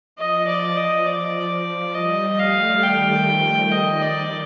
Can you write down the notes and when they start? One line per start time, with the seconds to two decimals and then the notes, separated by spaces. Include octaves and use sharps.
0.18 F3 D#5
0.47 D5
0.77 D#5
1.07 D5
1.95 G3 D#5
2.39 A3 F5
2.83 D#3 G5
3.28 F3
3.71 D#3 D#5
4.02 D5